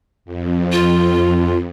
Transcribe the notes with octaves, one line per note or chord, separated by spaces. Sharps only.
F2
F4